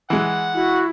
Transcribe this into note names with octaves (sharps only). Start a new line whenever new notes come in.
E3 G#3 F#5 E6
E4 F#4